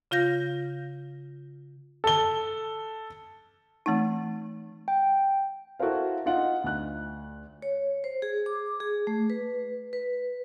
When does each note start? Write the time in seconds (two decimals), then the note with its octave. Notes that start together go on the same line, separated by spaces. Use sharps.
0.11 C#3 F4 F5 G6 A#6
2.04 A4 G7
3.86 E3 A3 C4 D#4
4.88 G5
5.80 E4 F#4 A4 A#4 C5 F5
6.26 D#4 F4 D#5 F#5
6.64 D2 F#6
7.62 C#5
8.04 C5
8.22 G#4
8.46 D6
8.80 G#4
9.07 A3
9.30 B4
9.93 B4